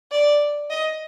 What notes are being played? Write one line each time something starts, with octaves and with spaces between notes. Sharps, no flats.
D5
D#5